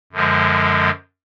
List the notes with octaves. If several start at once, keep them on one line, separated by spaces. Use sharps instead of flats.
F#2 D3 F3 G#3